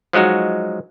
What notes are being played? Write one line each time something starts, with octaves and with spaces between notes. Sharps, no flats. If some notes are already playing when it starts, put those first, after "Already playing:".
F3 F#3 G#3 D#4 F#4